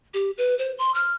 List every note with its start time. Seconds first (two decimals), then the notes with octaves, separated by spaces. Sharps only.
0.14 G4
0.38 B4
0.59 C5
0.79 C6
0.94 F6